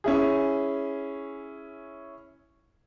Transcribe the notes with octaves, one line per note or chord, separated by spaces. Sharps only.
C#4 E4 G#4